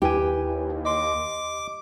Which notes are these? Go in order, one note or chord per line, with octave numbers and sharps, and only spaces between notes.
D#2 E4 G4 B4 G#5
D#5 C6 D6